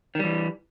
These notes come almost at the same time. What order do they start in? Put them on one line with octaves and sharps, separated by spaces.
D#3 G3 E3